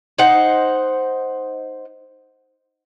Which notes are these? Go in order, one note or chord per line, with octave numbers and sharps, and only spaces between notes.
D#4 C5 F#5